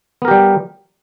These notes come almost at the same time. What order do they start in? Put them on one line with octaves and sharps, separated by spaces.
B3 A#4 G4 G3